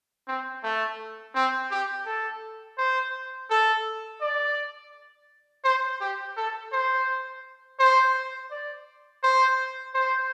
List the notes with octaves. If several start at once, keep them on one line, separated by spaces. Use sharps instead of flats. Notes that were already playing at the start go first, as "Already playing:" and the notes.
C4
A3
C4
G4
A4
C5
A4
D5
C5
G4
A4
C5
C5
D5
C5
C5